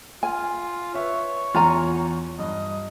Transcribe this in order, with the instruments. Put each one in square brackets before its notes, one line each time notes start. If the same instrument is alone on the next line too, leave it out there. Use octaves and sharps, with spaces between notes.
[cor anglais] F4 [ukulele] G#5
[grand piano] B4 E5 [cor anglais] C#5
[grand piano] E2 [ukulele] F4 G#5 A#5
[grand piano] G2 [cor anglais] D#5